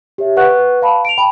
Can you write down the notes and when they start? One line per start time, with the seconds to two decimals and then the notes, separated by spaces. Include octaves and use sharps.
0.18 G4 C#5 E5
0.37 B4 F#5 C#6 F#6
0.82 F5 A5 B5
1.05 D7 F7
1.18 G5 A5 B5